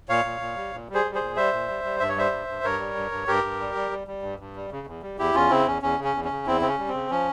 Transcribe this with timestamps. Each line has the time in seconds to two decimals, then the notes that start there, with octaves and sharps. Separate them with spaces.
0.09 A#2 C#5 F5
0.25 A#2
0.40 A#2
0.57 G3
0.73 A#2
0.89 G3
0.94 G#4 C5
1.05 G3
1.15 G#4 C5
1.21 A#2
1.36 G3 C5 E5
1.53 A#2
1.68 G3
1.84 G3
2.00 G2 E5
2.09 C#5
2.16 G3 C5 E5
2.32 G2
2.48 G2
2.64 G2 A#4 C#5
2.79 G3
2.96 G2
3.12 G2
3.27 G2 G4 A#4
3.44 G2
3.60 G3
3.75 G3
3.91 G3
4.07 G3
4.23 G2
4.40 G2
4.56 G3
4.72 C#3
4.87 E2
5.02 G3
5.19 E2 E4 G4
5.34 E2 C#4 F4
5.50 C#3 C4 E4
5.67 E2 C#4
5.82 E2 C#4
5.98 C#3
6.04 C#4
6.14 E2
6.24 C#4
6.31 C#3
6.46 E2 C4 E4
6.61 C#3 C4
6.67 C#4
6.78 G3
6.88 C#3 C4
7.10 F3 C#4